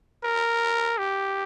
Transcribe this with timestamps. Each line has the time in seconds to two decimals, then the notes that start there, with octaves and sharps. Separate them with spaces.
0.24 A#4
0.98 G4